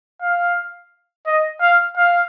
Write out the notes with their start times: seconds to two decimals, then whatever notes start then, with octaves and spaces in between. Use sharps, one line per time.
0.22 F5
1.27 D#5
1.61 F5
1.97 F5